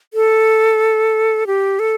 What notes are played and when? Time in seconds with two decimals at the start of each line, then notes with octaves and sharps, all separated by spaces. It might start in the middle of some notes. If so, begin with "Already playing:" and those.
0.14 A4
1.47 G4
1.79 A4